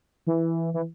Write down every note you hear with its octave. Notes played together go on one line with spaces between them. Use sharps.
E3
E3